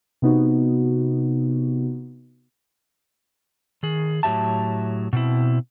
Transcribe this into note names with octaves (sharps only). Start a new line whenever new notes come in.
C3 B3 D#4 F#4
D#3 G#4
A2 F#3 G4 E5 A5
B2 C4 E4